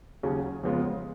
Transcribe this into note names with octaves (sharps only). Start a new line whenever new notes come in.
D#2 C#3 F#3 C#4 G#4
F2 C#3 G#3 B3 F4